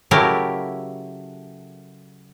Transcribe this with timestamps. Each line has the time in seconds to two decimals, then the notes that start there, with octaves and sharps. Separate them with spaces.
0.11 C#3 F#3 A3 E4 G4 A#4